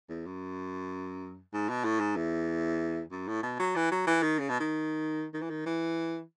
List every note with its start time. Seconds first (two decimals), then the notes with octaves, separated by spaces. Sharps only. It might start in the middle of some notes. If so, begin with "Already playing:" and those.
0.09 E2
0.26 F#2
1.53 G#2
1.69 B2
1.84 A2
2.00 G#2
2.16 E2
3.11 F#2
3.28 A2
3.43 B2
3.59 F#3
3.76 E3
3.91 F#3
4.07 E3
4.22 D#3
4.39 C#3
4.49 B2
4.60 D#3
5.34 D#3
5.42 E3
5.50 D#3
5.66 E3